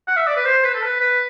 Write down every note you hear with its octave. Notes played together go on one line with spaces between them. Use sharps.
F#5
E5
D5
B4
C5
B4
A4
B4
B4